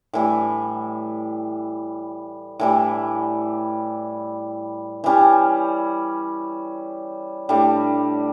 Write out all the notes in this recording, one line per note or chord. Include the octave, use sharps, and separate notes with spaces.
A2 E3 G3
A2 E3 G3
E3 G3 C#4
A2 G3 D4 A4